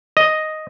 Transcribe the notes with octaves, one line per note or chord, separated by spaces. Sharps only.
D#5